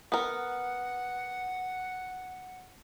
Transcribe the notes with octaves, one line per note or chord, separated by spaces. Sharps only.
B3 A#4 F#5